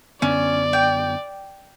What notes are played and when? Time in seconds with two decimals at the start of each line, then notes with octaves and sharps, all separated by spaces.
0.22 F#2 D3 B3 C#4 D5
0.73 G5